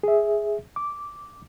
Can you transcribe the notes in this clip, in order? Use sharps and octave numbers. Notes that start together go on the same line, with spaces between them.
G#4 E5
D6